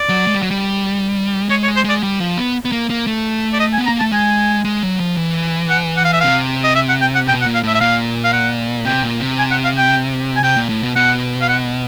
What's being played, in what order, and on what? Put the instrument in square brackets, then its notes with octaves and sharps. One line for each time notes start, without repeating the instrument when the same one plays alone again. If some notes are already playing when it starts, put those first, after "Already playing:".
Already playing: [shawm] D5
[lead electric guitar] F#3
G#3
G3
F#3
G3
[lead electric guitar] G#3 [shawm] C#5
[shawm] C#5
[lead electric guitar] G#3
[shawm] C5
[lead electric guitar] G#3 [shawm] D5
[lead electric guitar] G3
F3
B3
B3
A#3
A#3
A3
[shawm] D5
D#5
G#5
[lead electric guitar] B3
[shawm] A#5
[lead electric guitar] A#3
[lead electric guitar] A3 [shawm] A5
[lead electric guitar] G#3 [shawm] G#5
[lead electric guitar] G#3
F#3
F3
E3
[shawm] F#5
F#5
F5
E5
[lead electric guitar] C3 [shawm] F5
[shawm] D#5
E5
F#5
G5
F#5
[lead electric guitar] B2 [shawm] G5
[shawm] F#5
[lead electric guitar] A#2
[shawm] F5
[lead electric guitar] A2 [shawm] E5
[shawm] E5
[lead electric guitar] A#2 [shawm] F5
[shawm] F5
F#5
[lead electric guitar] C3 [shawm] G5
[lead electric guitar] A#2
C3
[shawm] G#5
F#5
F5
G5
G#5
[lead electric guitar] C3 [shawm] G5
[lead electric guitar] A#2
A2
B2
[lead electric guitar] B2 [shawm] F#5
[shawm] F5
F#5